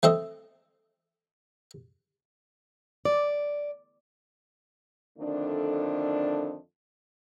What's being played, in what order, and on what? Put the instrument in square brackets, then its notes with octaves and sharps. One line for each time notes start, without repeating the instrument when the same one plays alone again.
[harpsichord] A3 C4 A4 D#5
[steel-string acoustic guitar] D5
[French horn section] F2 D3 D#3 A3 D4